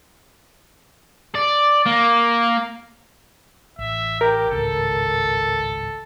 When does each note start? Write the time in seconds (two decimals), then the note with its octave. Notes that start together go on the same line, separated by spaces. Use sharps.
1.35 D5
1.86 A#3
3.79 A1 E5
4.21 G4 A#4
4.51 G#1 C#2 A2 A4